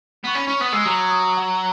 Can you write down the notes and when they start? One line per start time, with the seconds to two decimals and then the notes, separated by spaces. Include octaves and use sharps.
0.24 B3 C#6
0.35 C#4 B5
0.47 C#4 C#6
0.60 B3 D#6
0.73 G#3 E6
0.85 F#3 D#6
1.11 D#6
1.37 F#5